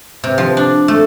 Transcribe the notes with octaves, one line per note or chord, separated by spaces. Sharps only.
C3
F3
D4
A3